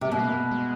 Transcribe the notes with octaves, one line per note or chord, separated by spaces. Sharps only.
C3 B3
B2 A#3
A3
A#3
G#3